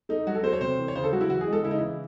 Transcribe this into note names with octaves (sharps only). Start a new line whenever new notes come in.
A3 D#4
F#3 F#4
A4
A3 C5
C#5
C3 C5
E3
C#5
C#3 C5
A4
F#3 F#4
E4
E3 F#4
G#4
G#3
A4
C#3 E4
D#4
E3 E4